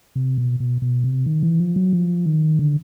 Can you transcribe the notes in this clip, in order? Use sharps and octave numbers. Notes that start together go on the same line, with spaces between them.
C3
B2
B2
B2
C3
D#3
E3
F3
F#3
F3
D#3
D3